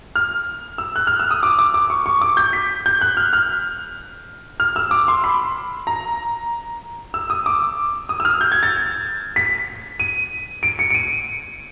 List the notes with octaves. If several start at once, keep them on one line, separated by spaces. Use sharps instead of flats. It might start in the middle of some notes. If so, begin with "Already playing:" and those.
F6
E6
F#6
F6
E6
D#6
D6
D6
D6
C#6
C#6
D6
G6
B6
G6
F#6
F6
F6
F6
E6
D6
C6
B5
A#5
E6
D#6
D6
D#6
E6
F6
G6
G#6
A6
B6
D#7
D7
C#7
D7
D#7